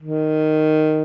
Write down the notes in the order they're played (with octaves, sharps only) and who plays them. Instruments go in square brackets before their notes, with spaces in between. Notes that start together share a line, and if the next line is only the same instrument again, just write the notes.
[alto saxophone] D#3